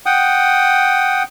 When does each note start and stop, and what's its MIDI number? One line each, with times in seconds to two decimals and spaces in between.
0.06 1.23 78
0.06 1.23 79
0.06 1.23 87